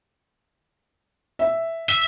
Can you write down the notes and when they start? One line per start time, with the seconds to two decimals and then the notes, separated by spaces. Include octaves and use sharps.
1.39 E5
1.89 E5